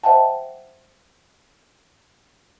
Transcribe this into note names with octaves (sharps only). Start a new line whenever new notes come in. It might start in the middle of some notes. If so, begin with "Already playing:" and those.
C5 D#5 E5 F#5 G5 A5